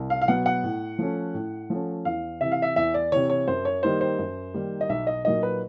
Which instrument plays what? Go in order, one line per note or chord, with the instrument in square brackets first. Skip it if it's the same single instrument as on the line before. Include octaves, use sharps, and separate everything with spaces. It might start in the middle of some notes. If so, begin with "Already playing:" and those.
Already playing: [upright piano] C2
F5
F5
B2 F#3 B3 F#5
F#5
A2
F3 A3 C#4
A2
F3 A3 C#4
E2 F5
C3 E3 E5
F5
E5
E2 E5
D5
C3 E3 C#5
C#5
F#2 C5
C#5
D#3 G3 A#3 D#4 C5
C5
F#2
D#3 G3 A#3 D#4
D#5
B1 E5
D#5
A#2 F#3 A#3 D#4 D#5
B4